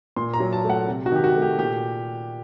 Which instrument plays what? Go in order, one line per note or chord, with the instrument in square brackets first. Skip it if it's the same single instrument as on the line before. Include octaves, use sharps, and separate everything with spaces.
[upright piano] A#2 C6
A#5
F#3
A5
A3
F#5
C3
F#4
D#3 G4
F#4
A3
G4
A#2 G4